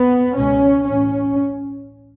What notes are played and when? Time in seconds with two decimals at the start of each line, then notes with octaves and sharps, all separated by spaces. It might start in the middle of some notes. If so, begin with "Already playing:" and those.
Already playing: B3
0.35 C#2 B2 C#4
0.85 A1 A2 C#4